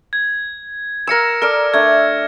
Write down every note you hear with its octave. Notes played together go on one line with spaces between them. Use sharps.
G#6
A#4 F5 E6 A#6 C#7 E7
A4 A#4 D5 F6
A3 D4 G#6